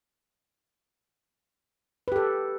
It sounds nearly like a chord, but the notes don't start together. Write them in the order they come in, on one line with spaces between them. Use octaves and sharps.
B4 G4 A4